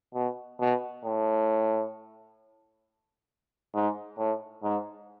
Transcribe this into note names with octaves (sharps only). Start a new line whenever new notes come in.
B2
B2
A2
G#2
A2
G#2